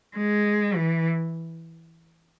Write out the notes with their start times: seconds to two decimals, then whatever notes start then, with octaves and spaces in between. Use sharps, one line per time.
0.17 G#3
0.75 E3